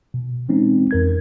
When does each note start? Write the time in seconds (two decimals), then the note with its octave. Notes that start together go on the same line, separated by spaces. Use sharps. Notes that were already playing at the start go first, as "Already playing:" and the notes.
0.14 B2
0.49 E3 G#3 C4 C#4 D#4
0.91 F2 A#4 G#6